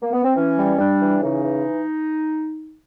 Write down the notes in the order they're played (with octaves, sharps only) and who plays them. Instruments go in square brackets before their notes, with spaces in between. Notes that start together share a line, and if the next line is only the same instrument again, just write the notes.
[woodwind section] A#3
B3
C4
E3 C#4
G3
G3 D4
E3
C#3 D#4
E3